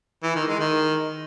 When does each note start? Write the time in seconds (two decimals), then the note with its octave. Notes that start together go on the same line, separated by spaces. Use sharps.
0.24 E3
0.35 D#3
0.47 G#3
0.59 D#3